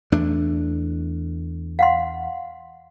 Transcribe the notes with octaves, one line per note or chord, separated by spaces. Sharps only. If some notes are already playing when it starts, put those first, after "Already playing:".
E2 A3 D4
F5 F#5 C6